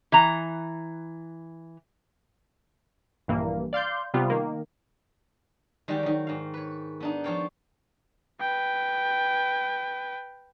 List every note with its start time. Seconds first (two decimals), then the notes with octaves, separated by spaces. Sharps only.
0.12 E3 A#5
3.28 A#1 G2 E3 A#3
3.73 D5 F5 C6 G6
4.14 C3 G3 B3 F4
4.30 D#3 A#3
5.88 D#3 G3 G#3 F#4 G4 D5
6.03 D#3 F#3
6.27 G#2 F5
6.54 B4 C#5
7.00 B3 D4 D#4
7.24 F3 F4 C#5 D5 F5 G5
8.41 B4 G5